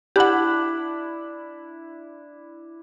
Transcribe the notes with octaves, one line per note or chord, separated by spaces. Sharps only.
D4 E4 G4 F#5 B5